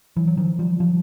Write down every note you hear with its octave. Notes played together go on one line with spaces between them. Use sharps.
E3 F#3
F#3
D#3 F3
F3 G3
F3 G3